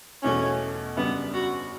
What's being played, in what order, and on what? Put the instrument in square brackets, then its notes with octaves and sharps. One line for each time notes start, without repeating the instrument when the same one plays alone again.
[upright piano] E2 B2 A3 [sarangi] C#4
[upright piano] F#2 C#3 G3 D4 [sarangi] B3
[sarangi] F#4